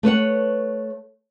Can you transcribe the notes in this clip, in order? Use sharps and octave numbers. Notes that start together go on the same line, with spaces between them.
A3 B4 C#5 F#5